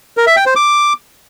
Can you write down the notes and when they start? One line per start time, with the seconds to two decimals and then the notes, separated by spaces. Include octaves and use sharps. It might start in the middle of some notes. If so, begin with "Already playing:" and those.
0.17 A#4
0.27 E5
0.37 G5
0.46 C5
0.56 D6